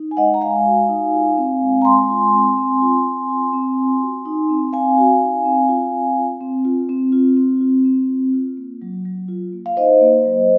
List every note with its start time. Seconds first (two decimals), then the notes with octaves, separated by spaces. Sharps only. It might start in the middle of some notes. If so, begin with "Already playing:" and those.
Already playing: D#4
0.11 G#5
0.17 G#3 D#5 F#5
0.34 A#5
0.41 G#3 F5 G#5
0.65 F#4
0.89 D#4
1.14 F4
1.38 C4
1.61 G#3
1.82 A#5
1.85 G#3 G#5 C6
2.10 F4
2.34 C4
2.57 C4
2.82 F4
3.05 C4
3.29 F4
3.53 C4
3.78 F4
4.01 F#4
4.25 D#4
4.49 C4
4.73 C4 F5 G#5
4.98 F#4
5.21 D#4
5.45 C4
5.69 F4
5.93 C4
6.18 F4
6.41 C4
6.65 F4
6.89 C4
7.12 F4
7.37 C4
7.61 F4
7.85 C4
8.09 F4
8.33 F4
8.57 A#3
8.81 F#3
9.05 F#3
9.28 F4
9.53 A#3
9.66 F5
9.77 D#4 C5 D#5
10.01 A#3
10.25 F#3